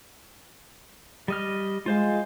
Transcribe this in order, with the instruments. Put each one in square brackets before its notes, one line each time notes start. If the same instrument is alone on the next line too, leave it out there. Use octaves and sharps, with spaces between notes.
[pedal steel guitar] G3 D#5 F6
[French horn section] G#3 [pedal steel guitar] F4 C5 F5